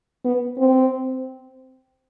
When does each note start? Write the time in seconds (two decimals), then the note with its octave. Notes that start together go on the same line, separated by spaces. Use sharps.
0.24 B3
0.58 C4